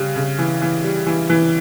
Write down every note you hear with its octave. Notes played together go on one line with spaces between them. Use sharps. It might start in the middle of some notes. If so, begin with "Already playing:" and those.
Already playing: C#3 G3 F#6
C#3
E3
E3
G3
E3
E3